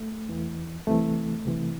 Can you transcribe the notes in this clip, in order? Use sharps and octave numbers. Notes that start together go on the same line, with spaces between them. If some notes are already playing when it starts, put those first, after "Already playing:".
Already playing: A3
E2 E3
C2 C3 E3 A3
C2 C3 E3